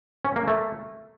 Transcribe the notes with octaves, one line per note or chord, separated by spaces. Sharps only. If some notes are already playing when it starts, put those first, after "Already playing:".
C#4
A#3
A3